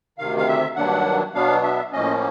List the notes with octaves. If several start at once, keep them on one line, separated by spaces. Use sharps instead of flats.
D2 C3 D#3 F5
F5
E5
G2 D#3 F#3 A#3 D4 F#5
B2 F#3 B3 D4 F5
E5
A2 F3 A#3 C#4 D#5